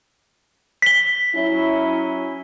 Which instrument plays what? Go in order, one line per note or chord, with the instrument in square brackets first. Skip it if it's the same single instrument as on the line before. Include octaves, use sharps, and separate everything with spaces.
[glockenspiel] B6 G7
[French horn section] F#3 C#4 E4